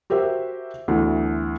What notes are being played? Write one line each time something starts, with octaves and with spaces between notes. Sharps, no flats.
F#4 G4 A#4 C5 E5
D2 D3 E3 B3